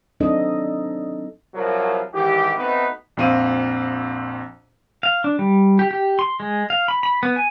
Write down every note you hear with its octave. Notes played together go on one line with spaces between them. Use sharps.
F#3 C4 D4 D#4 A4 D#5
C2 F3 F#3 A#4
G#2 D#3 E3 G4
A3 B3 C4 D#4 F#4 B4
A#1 F2 C4 F5 D#7
F5
D4
G3
G4
G4
C6
G#3
F5
B5
B5
B3
G#5